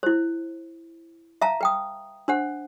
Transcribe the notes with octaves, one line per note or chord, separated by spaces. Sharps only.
E4 C5
E5 F5 A5 A#5
B4 G5 D#6
D4 C5 F#5